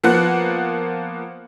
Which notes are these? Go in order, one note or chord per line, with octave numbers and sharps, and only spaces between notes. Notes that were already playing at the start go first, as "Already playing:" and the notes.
F3 A#3 B3 F#5 F#6